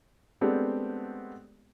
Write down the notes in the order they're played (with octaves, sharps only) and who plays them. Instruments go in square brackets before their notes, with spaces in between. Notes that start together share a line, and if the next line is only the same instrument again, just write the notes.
[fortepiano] G#3 A3 B3 C4 D4 G4